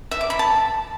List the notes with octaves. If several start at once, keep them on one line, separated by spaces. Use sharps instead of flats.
E5
D6
B5
A5